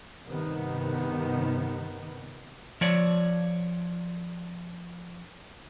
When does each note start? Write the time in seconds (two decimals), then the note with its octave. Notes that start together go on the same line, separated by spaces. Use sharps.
0.25 G2 C3 D#3 B3
2.81 F3 C#5 D5